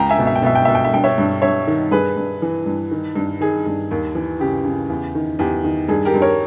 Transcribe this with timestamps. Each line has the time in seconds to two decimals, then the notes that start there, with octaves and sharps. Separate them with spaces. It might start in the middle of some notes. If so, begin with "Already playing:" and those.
Already playing: C#2 G5 A#5
0.09 E5 G#5
0.19 B2
0.27 E5
0.35 G5
0.42 B2 E5
0.55 G5
0.65 B2 E5
0.75 G5
0.84 E5
0.93 G2 G5
1.04 C#5 E5
1.18 G2
1.42 G2 C#5 E5
1.67 D#3
1.91 G2 G#4 B4
2.17 G2
2.42 E3
2.66 G2
2.91 D#3
3.16 G2
3.41 D#3 G#4
3.66 G2
3.91 D#2
4.15 E3
4.40 C#3 G4
4.64 C#3
4.89 E2
5.15 D#3
5.39 E2 G4
5.64 D#3
5.89 G2 G#4
6.05 G4 A#4
6.14 G2
6.22 A#4 C#5